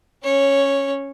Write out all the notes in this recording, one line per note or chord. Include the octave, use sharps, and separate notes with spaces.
C#4 C#5